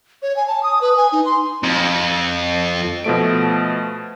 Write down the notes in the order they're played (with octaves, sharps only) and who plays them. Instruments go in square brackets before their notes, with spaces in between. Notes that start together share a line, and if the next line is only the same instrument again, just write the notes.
[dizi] C#5
G#5
A5
D#6
B4
G#5
D#4
C6
[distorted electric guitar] F2
[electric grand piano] B2 F3 A3 D7